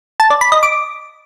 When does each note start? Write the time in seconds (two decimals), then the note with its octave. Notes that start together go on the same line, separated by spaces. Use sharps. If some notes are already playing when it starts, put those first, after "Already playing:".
0.20 A5
0.30 D5
0.41 B5
0.52 D#5
0.63 D6